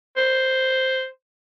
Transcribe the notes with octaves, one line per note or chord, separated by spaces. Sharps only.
C5